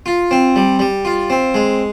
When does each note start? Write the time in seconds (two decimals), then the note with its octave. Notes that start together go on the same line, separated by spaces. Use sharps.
0.06 F4
0.31 C4
0.56 G3
0.79 G3
1.05 F4
1.30 C4
1.54 G#3